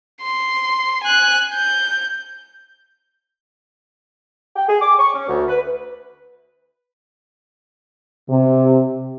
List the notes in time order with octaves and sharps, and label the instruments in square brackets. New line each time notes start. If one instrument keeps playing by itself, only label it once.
[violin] C6
G#5 F#6
G6
[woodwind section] G5
G#4
D6
C#6
C#4
D2
B4
[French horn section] C3